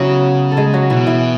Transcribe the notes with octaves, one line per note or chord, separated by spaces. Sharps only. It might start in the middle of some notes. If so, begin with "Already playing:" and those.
Already playing: C#3 F#3 B3 C#4 E4 F#4
A4
G#3 G#4
F#3 F#4
B2 E3 E4
E3 E4